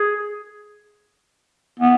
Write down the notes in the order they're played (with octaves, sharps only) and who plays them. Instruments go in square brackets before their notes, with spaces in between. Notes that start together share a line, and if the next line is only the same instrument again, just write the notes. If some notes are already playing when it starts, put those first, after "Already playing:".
Already playing: [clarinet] G#4
B3